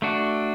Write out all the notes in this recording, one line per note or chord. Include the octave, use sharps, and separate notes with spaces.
A3 D4 F#4